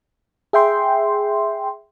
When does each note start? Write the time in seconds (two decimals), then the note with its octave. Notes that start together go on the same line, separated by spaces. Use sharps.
0.53 G#4 E5 G5 C6